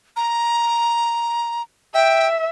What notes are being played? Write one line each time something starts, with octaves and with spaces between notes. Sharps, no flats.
A#5
E5 G5